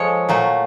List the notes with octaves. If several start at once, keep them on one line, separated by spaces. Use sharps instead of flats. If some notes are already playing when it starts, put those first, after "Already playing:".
Already playing: F3 G#3 A4 C#5
A#2 F#3 A3